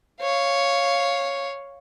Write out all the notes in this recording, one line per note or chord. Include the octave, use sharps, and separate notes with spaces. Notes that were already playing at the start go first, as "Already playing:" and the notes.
C#5 F5